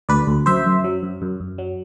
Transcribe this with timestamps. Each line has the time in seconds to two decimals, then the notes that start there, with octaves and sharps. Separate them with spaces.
0.09 D2 B4 D5
0.27 D2
0.46 F#2 C5 E5
0.66 F#2
0.84 F#3
1.03 F#2
1.22 F#2
1.40 F#2
1.58 F#3